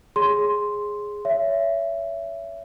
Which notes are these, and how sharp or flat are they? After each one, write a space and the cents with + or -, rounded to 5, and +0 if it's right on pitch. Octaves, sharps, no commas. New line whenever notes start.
G#4 +0 C#5 +10 C6 +0
C#5 +25 E5 +20